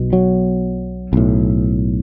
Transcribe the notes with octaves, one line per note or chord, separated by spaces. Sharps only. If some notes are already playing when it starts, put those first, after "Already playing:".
Already playing: B1 B2
F#3
B1 A2